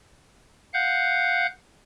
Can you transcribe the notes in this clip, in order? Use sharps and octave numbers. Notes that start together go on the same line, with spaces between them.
F5 F#5 F#6 G6